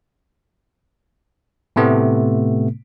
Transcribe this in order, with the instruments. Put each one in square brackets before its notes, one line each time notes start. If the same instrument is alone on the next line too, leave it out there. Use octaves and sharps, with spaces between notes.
[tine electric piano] A2 C3 A3 B3